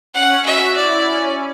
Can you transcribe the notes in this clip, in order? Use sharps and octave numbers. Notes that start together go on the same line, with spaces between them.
C#4 F#5
F#4 E5
E4 D5
C#4